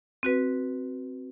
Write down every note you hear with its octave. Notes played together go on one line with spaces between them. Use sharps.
C4 F#4 B4